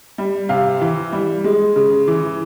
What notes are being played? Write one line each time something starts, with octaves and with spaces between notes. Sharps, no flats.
G3
C3 F5
E3
G3
G#3
C#3
E3